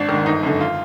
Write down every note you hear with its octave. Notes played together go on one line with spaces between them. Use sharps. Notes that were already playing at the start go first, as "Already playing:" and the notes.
Already playing: G#1 D4
D#3
G#2
G1 D#4
F#2 D3
F4